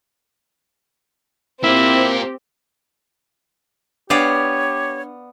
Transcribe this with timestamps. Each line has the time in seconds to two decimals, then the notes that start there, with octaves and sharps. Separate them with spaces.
1.64 A#3 C4 E4 F4 G4
4.10 B3 D4 G4 C#5 D5 F5